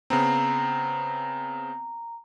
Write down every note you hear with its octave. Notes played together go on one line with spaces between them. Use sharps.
C#3 B3 C4 A#5